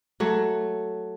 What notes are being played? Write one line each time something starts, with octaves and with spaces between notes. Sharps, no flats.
F#3 A3